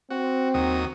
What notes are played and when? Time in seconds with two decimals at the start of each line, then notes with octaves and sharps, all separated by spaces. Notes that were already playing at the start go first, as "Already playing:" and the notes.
0.10 C4 F#4
0.54 D#2 F#3 D#6